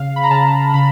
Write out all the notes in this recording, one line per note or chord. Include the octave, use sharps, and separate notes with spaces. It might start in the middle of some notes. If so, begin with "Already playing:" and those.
Already playing: C#3 F5
B5
A#5
C#3 A5
C#3 B5